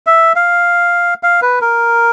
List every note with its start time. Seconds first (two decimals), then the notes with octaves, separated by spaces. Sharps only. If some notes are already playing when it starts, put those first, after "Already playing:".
0.07 E5
0.36 F5
1.23 F5
1.42 B4
1.61 A#4